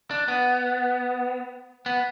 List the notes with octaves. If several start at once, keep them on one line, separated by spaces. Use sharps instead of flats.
D4
B3
B3